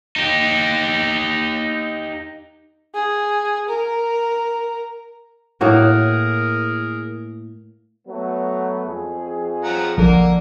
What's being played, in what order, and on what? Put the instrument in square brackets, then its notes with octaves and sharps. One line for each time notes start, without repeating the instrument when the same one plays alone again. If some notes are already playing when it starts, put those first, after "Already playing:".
[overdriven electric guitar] D#4 G4
[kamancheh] G#4
A#4
[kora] A2 A#3 F#4 [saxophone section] G#4 A#4
[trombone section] F#3 A3 B3
F2 G#4
[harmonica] F3 F#5 A#5
[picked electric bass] A#1 F3 [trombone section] D3 [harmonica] A#3 A#4